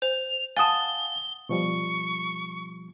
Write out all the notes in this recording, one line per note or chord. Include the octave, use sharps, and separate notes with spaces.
C5 F7
F5 F#5 G#5 A5 D#6 A6 G7
B2 F3 G3 C#6